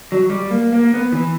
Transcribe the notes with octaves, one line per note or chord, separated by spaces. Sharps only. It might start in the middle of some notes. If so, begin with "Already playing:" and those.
F#3
G3
A#3
A#3
B3
E3